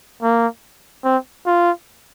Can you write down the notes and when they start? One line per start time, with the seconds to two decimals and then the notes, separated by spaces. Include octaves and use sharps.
0.22 A#3
1.04 C4
1.46 F4